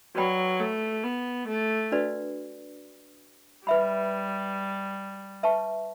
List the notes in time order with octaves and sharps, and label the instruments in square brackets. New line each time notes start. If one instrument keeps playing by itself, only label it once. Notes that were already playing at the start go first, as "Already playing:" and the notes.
[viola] F#3 [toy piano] F#4 B4 D5 G5 B5
[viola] A3
B3
A3
[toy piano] D4 F#4 B4 D5
[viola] G3 [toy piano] B4 E5 B5
[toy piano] B4 E5 A5 C#6